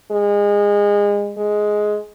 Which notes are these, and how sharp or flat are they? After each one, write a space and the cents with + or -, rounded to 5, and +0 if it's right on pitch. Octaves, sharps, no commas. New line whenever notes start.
G#3 -25
G#3 +10